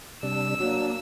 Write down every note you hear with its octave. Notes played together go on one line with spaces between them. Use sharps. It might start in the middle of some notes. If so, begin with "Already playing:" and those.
C3 G3 D4 E6
F#3 A#3 D4